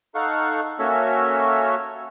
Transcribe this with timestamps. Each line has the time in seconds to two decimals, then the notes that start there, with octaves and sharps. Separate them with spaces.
0.15 D#4 A4 F5 F#5 C#6
0.79 A#3 C#4 F#4 A4 C#5 E5